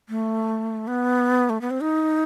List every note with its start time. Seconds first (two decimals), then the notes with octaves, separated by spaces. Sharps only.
0.09 A3
0.87 B3
1.50 A3
1.61 B3
1.70 C4
1.82 D#4